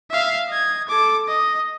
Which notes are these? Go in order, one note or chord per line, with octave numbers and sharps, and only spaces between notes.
E5 F5
D#5 G#6
A4 D6
D#5